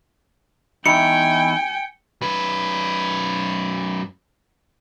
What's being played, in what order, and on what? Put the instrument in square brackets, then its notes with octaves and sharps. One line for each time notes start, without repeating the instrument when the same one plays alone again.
[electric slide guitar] E2 D#4 E4 [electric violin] G5 G#5 [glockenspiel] C#7
[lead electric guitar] F#2 B4